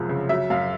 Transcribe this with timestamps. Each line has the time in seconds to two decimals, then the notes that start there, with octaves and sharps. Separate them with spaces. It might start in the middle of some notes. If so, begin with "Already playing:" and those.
Already playing: C2 F#2 F3 G#3
0.09 C#3
0.29 F#3 E5
0.50 F#2 F5